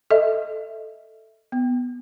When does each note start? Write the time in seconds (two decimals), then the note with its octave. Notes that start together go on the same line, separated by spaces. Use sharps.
0.11 A4 D#5 E5
1.52 B3